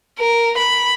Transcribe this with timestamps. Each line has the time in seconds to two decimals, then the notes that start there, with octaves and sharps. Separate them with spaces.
0.19 A#4
0.58 B5